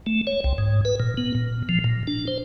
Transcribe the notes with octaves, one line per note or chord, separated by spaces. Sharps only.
A3
C#5
C2
G#2
B4
A#2
B3
A#2
F3
A#2
D4
C5